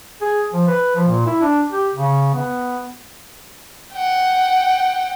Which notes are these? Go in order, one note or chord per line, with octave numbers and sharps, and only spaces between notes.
G#4
F3
B4
F3
A#2
E4
D4
G4
C#3
B3
F#5 G5